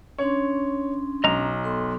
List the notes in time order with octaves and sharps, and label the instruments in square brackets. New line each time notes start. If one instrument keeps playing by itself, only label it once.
[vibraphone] C#4 D4 C6 [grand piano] C#5
[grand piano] B1 [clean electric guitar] D#5 A#5
[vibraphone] B3 A4 C6